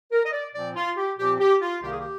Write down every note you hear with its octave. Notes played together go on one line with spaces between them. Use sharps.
A#4
D#5
D5
A#2 F3 C4 D5
F4
G4
A#2 F3 C4 G4
G4
F4
C2 C3 D#3 A#3 G4
G#4
G4